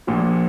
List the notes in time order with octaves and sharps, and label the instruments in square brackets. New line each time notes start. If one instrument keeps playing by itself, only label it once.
[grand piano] A#1 A#2 F3